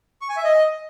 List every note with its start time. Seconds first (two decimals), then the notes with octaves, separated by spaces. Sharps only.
0.21 C#6
0.29 G#5
0.37 E5
0.44 D#5